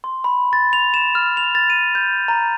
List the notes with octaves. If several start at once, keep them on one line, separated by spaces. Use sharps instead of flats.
C6
B5
A6
F7
E7
F6
F7
A6
D#7
G6
A#5